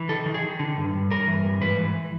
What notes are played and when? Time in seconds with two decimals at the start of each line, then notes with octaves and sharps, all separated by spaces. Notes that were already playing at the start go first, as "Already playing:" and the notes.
Already playing: E3
0.09 D#3 A4
0.26 D#3
0.34 G#4
0.43 D#3
0.59 D3
0.77 G2
0.93 G2
1.11 G2 A#4
1.27 E3
1.44 G2
1.62 G#2 B4
1.78 E3